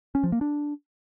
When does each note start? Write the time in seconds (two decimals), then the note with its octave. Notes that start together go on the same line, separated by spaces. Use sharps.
0.15 C#4
0.24 F3
0.32 A#3
0.41 D4